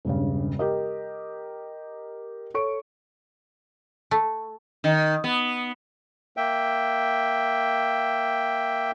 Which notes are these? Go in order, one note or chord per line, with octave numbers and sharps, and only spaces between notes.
E1 G2 C#3
G4 A#4 D#5
A4 C#5 C#6 D7
A3
D#3
B3
A#3 E5 G5